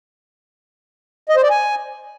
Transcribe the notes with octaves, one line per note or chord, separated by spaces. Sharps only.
D#5
C5
D5
G#5